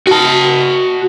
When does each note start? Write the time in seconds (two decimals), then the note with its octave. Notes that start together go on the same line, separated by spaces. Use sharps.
0.07 F#4 A5